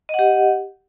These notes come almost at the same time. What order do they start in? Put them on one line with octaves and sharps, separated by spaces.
D#5 F#5 G4